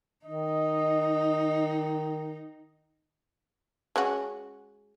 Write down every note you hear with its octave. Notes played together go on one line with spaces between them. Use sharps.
D#3 D#4 D#5
G#3 C#4 F#4